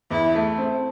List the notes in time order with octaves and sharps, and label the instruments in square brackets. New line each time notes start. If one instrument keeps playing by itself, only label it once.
[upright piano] E2 [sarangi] E4
[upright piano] A3
C4